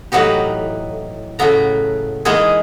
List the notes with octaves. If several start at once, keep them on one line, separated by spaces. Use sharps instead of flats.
A2 E3 F#3 B3 D#4 G4
A2 C#3 F#3 A3 B3 A#5
E3 G#3 A#3 B3 D#4 G#4